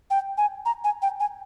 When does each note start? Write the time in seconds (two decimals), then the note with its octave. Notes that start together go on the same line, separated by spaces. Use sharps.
0.10 G5
0.38 G#5
0.66 A#5
0.84 G#5
1.02 G5
1.20 G#5